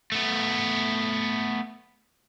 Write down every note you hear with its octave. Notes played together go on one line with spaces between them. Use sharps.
A3 B3